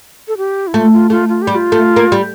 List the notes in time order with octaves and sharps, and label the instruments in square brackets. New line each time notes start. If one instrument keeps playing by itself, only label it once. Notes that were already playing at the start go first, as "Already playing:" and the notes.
[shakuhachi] A4
G4
E4
[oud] A3 [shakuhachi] F4
[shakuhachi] F4
[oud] A3 [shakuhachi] F4
[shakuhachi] F4
G4
[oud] G3
[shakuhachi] F4
[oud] A3
A#3
G3